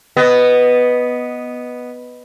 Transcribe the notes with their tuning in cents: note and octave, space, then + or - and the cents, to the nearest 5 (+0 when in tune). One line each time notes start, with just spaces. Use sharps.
B3 +0 D#5 +0